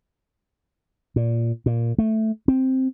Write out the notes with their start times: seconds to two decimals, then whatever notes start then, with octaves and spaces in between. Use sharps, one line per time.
1.16 A#2
1.66 A#2
1.98 A3
2.48 C4